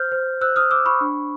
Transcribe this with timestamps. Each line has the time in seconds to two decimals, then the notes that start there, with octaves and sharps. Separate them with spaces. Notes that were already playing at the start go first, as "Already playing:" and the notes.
Already playing: C5 F6 G6
0.12 C5
0.41 C5 E6 F#6
0.56 D#6 F6
0.71 C5 D6 E6
0.86 B5 C#6
1.01 D4